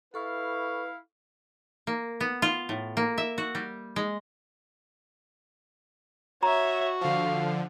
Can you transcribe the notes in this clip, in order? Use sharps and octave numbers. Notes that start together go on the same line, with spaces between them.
E4 A4 B4 F5 C#6
A#3
B3
F4
A2
A#3
E5
F#4
G3
G#3
F#4 C#5 E5 A#5
D3 F3 F5